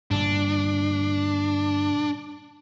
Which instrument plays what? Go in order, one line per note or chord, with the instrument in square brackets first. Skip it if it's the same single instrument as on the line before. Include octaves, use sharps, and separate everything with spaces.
[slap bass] G2 A#2 D3 [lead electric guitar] D4